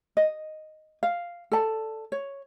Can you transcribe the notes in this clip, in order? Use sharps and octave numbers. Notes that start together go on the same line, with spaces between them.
D#5
F5
A4 D5 A5
C#5